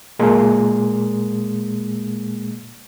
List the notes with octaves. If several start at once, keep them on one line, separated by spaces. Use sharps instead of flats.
A#2 G#3 A#3